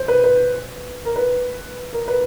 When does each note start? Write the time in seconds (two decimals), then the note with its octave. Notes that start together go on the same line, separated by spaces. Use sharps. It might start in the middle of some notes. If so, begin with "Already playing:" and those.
Already playing: C5
0.08 B4
0.24 B4
1.05 A#4
1.16 B4
1.93 A#4
2.08 B4